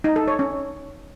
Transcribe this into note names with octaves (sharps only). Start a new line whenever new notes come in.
D#4
A4
C#5
C#4